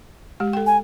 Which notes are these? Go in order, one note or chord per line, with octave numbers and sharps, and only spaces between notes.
G#3 G4
A4 G5
G#5